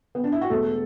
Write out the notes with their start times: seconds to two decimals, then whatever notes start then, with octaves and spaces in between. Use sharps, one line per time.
0.15 B3
0.24 D4
0.32 E4
0.41 F#4
0.50 E1 A3 A4